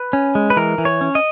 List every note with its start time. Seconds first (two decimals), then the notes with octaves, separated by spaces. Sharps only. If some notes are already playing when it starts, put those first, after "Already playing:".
Already playing: B4
0.13 C#4
0.35 G#3
0.50 B4
0.57 E3 A#4
0.78 E3
0.85 C#5
1.01 C#4
1.15 D#5